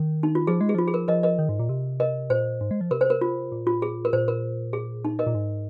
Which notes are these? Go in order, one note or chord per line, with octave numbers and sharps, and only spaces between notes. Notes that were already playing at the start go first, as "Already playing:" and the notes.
Already playing: D#3
D#4
F4
F3 G#4
G#3
G#4
F3 F4
G#4
A#4
F3 A#4 D#5
A#4 D#5
D#3
G#2
A#2
C3
A#4 D#5
A#2 C5
G#2
G#3
F3
C3 A#4
C5
A#4
F4
A#2
F4
G#4
A#4
A#2 C5
A#4
G#4
D#4
A#4 D#5
A#2
G#2